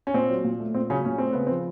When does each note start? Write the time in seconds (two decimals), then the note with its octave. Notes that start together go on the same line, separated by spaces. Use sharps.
0.07 C#4
0.14 A#2 C4
0.29 F#3
0.44 A#2
0.60 A3
0.74 A#2 C4
0.90 C#3 F#3 C#4
1.05 A#2 C#4
1.18 A3 C4
1.32 C#3 B3
1.47 C4
1.50 F3